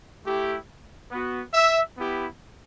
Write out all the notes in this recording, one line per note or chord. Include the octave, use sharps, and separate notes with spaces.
A3 E4 G4
B3 F#4
E5
B3 E4 G4